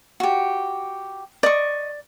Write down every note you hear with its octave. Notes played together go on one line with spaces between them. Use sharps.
F#4 G4
D5 D#5 C#6